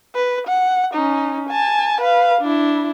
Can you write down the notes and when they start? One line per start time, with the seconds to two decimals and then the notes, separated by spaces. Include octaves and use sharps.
0.15 B4
0.47 F#5
0.94 C#4 D#4
1.49 G#5 A5
2.01 B4 F5
2.41 D4 E4